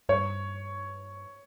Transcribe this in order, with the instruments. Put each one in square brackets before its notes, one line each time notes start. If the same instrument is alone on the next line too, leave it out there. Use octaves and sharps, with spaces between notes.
[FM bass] G2 [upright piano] C#5